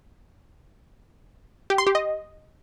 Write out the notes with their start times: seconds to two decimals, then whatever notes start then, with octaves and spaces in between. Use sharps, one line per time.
1.70 G4
1.78 C6
1.87 G4
1.95 D#5